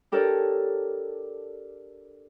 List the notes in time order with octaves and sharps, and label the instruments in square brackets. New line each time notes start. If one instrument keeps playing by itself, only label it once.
[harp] D4 G4 A4 A#4 C#5 D5